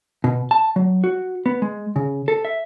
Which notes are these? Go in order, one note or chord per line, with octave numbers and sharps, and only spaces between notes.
B2
A5
F#3
F#4
B3
G#3
C#3
A4
E5